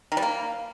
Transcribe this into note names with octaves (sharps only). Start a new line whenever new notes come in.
D#3
G3
A#3